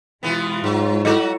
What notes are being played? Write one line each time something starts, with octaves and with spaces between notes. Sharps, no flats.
B2 E3 G#3 B3 F4
G#2 F#3
F#3 E4 F#4 A4 D#5